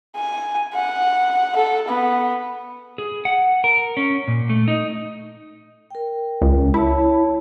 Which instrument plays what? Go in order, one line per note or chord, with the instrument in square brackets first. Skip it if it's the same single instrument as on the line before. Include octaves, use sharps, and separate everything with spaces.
[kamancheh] G#5
F#5
A4
B3
[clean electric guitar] G#4
F#5
A#4
C#4
A#2
A3
D#4
[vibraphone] A#4 G5
[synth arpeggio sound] C#2
[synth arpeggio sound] E4 [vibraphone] C#5 A5